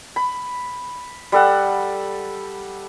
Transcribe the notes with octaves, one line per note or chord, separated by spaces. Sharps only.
B5
G3 A4 F#5